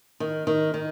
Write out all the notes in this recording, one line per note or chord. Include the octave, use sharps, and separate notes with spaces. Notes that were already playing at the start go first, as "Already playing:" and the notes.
D#3
D#3
D#3